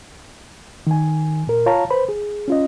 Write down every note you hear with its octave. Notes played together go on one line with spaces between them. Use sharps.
D#3 G#5
A#2 A#4
F4 C#5 F5 A5 A#5
B4 C5 B5
G#4
C#4 F4 D#5